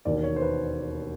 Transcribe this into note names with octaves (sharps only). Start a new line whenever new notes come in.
E1 D#2 D#3 D5
C#5
C5
B4